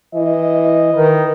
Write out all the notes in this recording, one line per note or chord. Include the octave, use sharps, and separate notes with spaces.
E3 D#5
D#3 B4